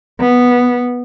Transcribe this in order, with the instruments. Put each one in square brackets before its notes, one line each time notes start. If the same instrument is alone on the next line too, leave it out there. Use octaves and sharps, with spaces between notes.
[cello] B3